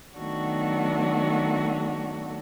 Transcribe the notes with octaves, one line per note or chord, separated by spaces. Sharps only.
D#3 F#3 A3 B3 D4 F#4